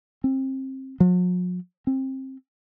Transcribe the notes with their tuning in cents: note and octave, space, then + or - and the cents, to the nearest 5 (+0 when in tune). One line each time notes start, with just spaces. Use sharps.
C4 +25
F#3 -45
C4 +25